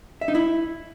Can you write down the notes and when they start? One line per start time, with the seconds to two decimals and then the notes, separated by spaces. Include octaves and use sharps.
0.21 E5
0.28 D#4
0.35 E4